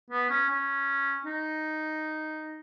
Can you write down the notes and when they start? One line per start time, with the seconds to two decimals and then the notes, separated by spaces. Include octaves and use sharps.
0.10 B3
0.29 C#4
0.49 C#4
1.26 D#4